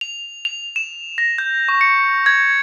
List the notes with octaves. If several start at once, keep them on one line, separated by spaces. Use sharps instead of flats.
F7
F7
E7
A#6
G6
C#6
C#7
G#6